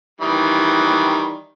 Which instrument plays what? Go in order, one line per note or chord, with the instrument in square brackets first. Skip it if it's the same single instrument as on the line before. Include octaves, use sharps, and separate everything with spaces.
[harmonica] D#3 E3 G3